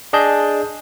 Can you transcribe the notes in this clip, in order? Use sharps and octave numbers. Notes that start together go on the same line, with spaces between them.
D4 G#4 D#5 A5 G6